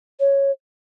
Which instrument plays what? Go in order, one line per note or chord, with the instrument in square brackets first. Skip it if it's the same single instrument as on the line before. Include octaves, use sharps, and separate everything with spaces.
[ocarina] C#5